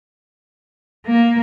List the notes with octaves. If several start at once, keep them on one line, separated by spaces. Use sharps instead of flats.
A#3